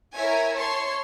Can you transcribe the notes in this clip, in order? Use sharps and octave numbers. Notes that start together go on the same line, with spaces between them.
E4 A#4 C#5 E5 G#5
C#5 A5 C6 C#6